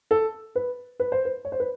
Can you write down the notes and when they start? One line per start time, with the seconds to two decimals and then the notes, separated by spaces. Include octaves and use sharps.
0.11 A4
0.56 B4
1.00 B4
1.12 C5
1.25 B4
1.45 C#5
1.52 C5
1.60 B4